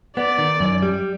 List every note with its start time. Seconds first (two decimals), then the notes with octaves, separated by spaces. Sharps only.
0.17 B3 D5
0.38 D#3
0.60 F#2
0.82 G3